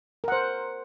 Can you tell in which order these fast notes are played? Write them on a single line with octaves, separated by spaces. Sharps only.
A#4 F#5 C5